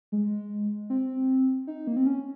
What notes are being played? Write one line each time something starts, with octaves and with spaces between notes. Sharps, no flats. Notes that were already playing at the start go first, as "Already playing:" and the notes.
G#3
C4
D#4
A#3
C4
C#4